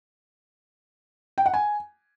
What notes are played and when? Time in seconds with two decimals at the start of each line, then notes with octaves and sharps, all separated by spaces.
1.38 G5
1.46 F#5
1.54 G#5